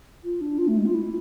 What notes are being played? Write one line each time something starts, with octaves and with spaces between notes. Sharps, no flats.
F4
D4
F4
A3
G#3
F4
E4